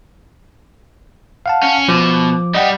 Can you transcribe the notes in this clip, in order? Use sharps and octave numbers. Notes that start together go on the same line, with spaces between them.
F5 F#5 A5
C#4
B2 F3 D6
G3 D#5 F#5 G5